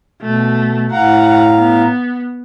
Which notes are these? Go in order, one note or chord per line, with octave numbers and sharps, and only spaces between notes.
B2 A3
A2 F5 F#5 A#5
B3